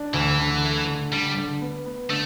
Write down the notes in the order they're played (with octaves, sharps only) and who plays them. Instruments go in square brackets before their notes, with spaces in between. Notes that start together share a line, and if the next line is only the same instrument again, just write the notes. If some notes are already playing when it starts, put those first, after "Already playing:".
Already playing: [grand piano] D4
[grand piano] D2 [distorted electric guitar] E3
[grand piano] D3
A3
D3
[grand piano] D3 [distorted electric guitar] G3
[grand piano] D3
B3
B3
[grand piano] D3 [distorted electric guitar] A3